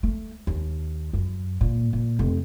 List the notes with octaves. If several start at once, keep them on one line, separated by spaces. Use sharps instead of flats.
A3
D#2
F#2
A#2
A#2
F1